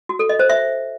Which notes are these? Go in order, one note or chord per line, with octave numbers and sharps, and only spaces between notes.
F#4
A4
D#5
C5
E5